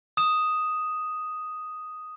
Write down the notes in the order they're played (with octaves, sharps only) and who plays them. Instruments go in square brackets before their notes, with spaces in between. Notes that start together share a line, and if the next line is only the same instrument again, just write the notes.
[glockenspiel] D#6 E7